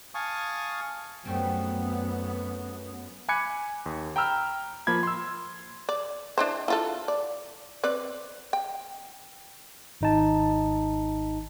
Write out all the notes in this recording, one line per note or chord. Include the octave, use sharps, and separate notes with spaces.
F5 G#5 A5 C#6 D#6
F#2 G3 A3 B3 C4
G#5 B5 D6 F#6 G#6 C#7
D#2
G5 A#5 B5 E6 F6
F3 A#3 B5 G#6
C6 E6
D5
D4 E4 C5
E4 F4 A4
D5
C4 B4 D5
G5
G#1 D#4 A5